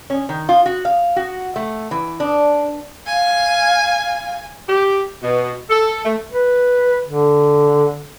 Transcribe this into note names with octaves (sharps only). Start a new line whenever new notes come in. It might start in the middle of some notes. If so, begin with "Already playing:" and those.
C#4
D#3
F4
F#4
F5
F#4
A3
E3
D4
F5 G#5
G4
B2
A4
A3
B4
D3